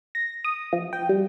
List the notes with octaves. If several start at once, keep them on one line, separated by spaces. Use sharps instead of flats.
A#6
D#6
F3
G5
G3